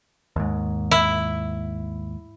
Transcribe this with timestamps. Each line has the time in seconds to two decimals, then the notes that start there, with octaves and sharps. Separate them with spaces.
0.36 D#2 G#2
0.91 E4